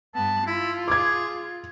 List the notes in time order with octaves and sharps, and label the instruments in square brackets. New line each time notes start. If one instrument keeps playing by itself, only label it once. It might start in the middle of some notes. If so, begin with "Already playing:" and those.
[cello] G2 B3 [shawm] A5
[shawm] E4 [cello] F4
[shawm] G#4 [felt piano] D6 G#6